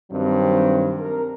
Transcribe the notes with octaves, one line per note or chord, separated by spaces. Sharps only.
G2 D#3 F#3 C4
A#4